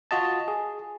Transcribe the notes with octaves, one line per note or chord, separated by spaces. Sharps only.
F4 F#4 D#5 A5
G#4